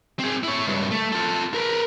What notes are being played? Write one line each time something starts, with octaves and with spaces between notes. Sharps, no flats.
C4 G#4
E4 C#5
C#2 G2
A3
F4 A4
A#4 B4